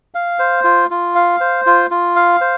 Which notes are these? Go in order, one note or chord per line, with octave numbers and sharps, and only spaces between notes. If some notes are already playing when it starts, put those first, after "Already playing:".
F5
C5
F4
F4
F5
C5
F4
F4
F5
C5